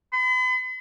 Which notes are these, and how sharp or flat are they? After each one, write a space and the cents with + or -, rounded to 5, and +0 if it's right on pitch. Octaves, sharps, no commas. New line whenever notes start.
B5 +45